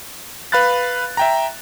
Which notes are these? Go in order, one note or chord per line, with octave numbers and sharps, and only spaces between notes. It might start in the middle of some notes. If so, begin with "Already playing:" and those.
B4 F5 B5 F#6 A6
E5 G5 A#5